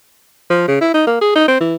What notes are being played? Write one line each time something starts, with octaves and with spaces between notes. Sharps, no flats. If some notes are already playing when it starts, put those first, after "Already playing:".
F3
C#3
E4
D#4
A#3
G#4
D#4
C4
E3